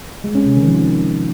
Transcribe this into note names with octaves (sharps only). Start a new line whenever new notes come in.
G#3
C#4
C3
D#3
F3